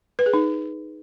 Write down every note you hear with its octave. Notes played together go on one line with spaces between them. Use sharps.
B4
G#4
D#4